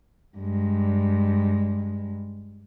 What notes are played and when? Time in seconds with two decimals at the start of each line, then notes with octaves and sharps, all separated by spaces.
0.38 G2 G#3